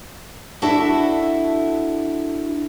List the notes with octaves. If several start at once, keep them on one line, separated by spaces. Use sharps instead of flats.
D4 E4 F#4 A4 E5